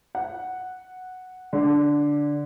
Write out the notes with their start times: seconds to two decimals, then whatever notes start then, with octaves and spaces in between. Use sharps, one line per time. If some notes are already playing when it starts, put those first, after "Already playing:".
0.15 F#5
1.53 D3